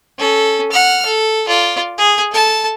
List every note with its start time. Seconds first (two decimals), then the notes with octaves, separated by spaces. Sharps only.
0.18 C#4 A4
0.71 F#5 F6
1.06 A4
1.47 F4 D5
1.98 G#4
2.31 A4 A5